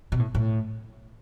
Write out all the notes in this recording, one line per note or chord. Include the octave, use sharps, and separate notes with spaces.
B2
A2
A2